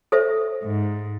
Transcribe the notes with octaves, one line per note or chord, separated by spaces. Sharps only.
A4 C5 E5
G#2